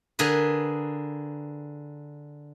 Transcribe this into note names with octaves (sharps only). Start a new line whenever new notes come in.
D3 G#4 A#4 B4